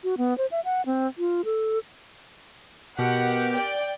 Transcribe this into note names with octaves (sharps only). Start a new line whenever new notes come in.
F#4
B3
C5
E5
F#5
C4
F4
A4
B2 G4 A#4 F#5
D5 G5